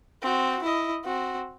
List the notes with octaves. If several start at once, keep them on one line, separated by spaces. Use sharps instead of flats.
C4 F#4
E4 D#5
C4 F#4